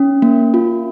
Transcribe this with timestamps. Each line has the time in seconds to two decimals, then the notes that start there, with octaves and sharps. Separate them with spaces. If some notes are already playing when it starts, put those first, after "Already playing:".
Already playing: C#4
0.22 A#3
0.54 F4